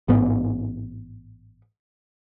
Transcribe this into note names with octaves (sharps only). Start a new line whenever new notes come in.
A1 G#2 B3